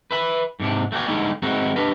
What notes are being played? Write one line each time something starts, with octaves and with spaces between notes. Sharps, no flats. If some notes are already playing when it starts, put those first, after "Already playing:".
B4 E5 B5
G#2 C3 D4
A3 F#4 G#4 D5 G#5
D3 G3 G#3 C#4 D#4 E4
G3 G#3 C4 D#4 E4 F#4
D4 G4 A4 B4 D#5